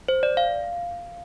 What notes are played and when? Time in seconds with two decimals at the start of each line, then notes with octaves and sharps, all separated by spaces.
0.08 C5
0.23 D5
0.37 F5